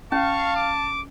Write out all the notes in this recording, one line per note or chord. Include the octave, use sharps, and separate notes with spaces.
C#4 F5 A5 C#6
D6